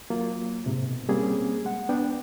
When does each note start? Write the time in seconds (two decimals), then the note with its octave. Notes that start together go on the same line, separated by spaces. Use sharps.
0.10 F#3 A#3 F4
0.66 G#2 C3
0.91 B2
1.09 G3 A#3 C4 C#4 G#4
1.65 G#3 F#5
1.89 B3 D4 G5